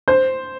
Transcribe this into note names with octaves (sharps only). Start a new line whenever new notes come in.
C5